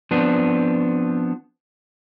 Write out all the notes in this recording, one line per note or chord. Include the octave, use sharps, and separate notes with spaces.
F3 B3 C4 D4